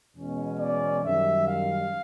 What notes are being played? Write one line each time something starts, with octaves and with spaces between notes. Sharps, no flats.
E2 B2 G#3 C#4
D5
F#2 D#3 G3 E5
F5